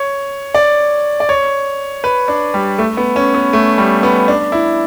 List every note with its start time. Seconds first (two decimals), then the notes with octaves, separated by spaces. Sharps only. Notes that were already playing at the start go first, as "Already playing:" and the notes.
Already playing: C#5
0.55 D5
1.20 D5
1.29 C#5
2.04 B4
2.28 D4
2.54 G3
2.78 A3
2.97 B3
3.16 C#4
3.34 B3
3.53 A3
3.78 G3
4.03 B3
4.28 D4
4.52 E4